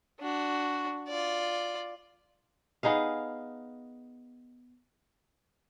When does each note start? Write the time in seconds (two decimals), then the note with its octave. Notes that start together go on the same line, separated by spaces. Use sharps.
0.20 D4 F#4
1.08 F4 D5
2.83 B3 D#4 G#4 F5